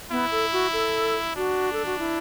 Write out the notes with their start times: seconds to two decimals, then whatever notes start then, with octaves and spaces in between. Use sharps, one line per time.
0.11 B3 E4
0.31 A4
0.53 F#4
0.73 A4
1.36 D4 F#4
1.73 A4
1.86 F#4
1.99 E4